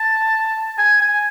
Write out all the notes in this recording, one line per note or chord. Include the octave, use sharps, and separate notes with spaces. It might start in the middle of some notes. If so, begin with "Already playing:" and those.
Already playing: A5
G#5
G#5